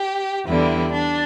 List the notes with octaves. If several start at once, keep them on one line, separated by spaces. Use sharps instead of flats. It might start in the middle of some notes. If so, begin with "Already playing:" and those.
Already playing: G4
E2 D3 G3 E4
D4